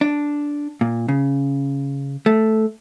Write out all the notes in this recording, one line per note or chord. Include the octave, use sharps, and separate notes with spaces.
D4
A#2
C#3
A3